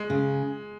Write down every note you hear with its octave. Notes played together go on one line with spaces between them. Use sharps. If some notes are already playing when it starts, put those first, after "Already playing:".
Already playing: G#3
C#3